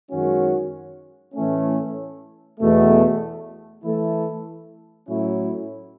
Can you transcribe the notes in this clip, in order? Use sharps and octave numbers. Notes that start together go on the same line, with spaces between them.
F#2 D#3 G#3 C#4 F#4
A2 E3 A3 C#4
E2 B2 A3
E3 A3 E4 A4
A2 F#3 C#4 E4